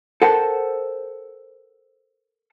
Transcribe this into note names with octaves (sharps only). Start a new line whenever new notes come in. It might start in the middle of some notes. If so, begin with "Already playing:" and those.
A4 A#4 C5 F#5 G5 A5